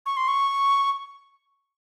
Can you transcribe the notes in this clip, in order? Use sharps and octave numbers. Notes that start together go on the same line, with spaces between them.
C#6
C6
C#6